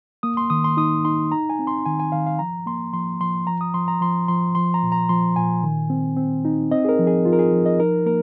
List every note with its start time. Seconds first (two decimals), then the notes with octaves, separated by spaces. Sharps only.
0.23 A#3 D#6
0.37 C6
0.50 D#3 D#6
0.64 C6
0.77 D#4 D#6
1.05 D#4 C6
1.32 D#4 A#5
1.50 G#5
1.59 C4
1.67 C6
1.86 D#3 G#5
2.00 G#5
2.12 D#3 F5
2.27 F5
2.39 F3 A#5
2.66 A#3 C6
2.94 F3 C6
3.21 F3 C6
3.47 F3 A#5
3.61 D#6
3.74 F3 C6
3.88 A#5
4.01 F3 C6
4.28 F3 C6
4.55 F3 C6
4.74 A#5
4.83 A#2
4.92 A#5
5.09 F3 C6
5.36 A#2 G#5
5.63 D#3
5.90 C4
6.17 C4
6.45 D#4
6.71 C4 D#5
6.85 G#4
6.89 A#4
6.99 F3
7.07 G#4
7.25 F3 F4
7.33 A#4
7.39 G#4
7.52 F3
7.66 D#5
7.80 D#4 A#4
8.06 A#3 A#4